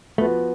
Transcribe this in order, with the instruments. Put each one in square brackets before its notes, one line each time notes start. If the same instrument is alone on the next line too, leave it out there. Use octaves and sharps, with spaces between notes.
[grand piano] F3 B3 F#4 B4 [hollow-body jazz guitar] A3